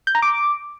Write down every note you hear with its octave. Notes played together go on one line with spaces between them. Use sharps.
G6
A#5
D6